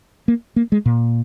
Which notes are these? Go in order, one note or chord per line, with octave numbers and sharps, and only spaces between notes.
A#3
A#3
G#3
A#2